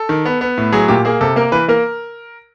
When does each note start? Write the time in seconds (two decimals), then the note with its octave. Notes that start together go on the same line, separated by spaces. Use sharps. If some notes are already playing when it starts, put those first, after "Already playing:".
Already playing: A4
0.09 D#3
0.25 B3
0.41 B3
0.58 A2
0.72 F#3 G#4
0.88 A#2 G4
1.05 A#3 G#4
1.21 C3 A4
1.36 A#3 A#4
1.52 E3 B4
1.68 A#3 A#4